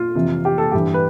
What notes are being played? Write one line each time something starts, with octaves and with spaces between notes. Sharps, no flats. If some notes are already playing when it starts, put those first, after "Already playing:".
Already playing: F4
F2 C3 E3
G4
A4
G2 E3 G4
B4